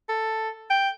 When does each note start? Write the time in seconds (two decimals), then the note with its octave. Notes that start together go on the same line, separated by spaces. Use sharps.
0.09 A4
0.71 G5